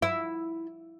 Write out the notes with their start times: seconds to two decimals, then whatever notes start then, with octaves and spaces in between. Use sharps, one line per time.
0.02 E4